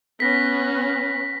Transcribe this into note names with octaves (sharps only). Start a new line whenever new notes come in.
B3 C#4 A#6 B6